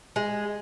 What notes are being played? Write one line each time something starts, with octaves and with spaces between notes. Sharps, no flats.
G#3